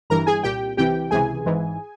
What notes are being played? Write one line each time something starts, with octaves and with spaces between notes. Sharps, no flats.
G1 G2 E3 A#4 A#5
G#4 G#5
C2 A#2 G4 G5
C2 C3 E3 G4 G5
C#2 C3 E3 G#4 G#5
G#1 G#2 E3